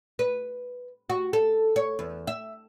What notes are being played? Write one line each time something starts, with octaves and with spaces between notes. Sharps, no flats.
B4
F#4
A4
C#5
E2
E5